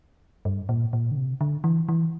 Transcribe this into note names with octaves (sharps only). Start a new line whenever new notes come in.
G2
A#2
A#2
D3
C3
D3
E3
E3